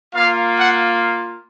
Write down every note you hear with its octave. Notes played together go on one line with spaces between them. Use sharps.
A#3 F4 F5
F#5